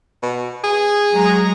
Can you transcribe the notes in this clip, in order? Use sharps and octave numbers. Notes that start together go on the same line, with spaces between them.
B2
G#4
F#3 G#3 A#5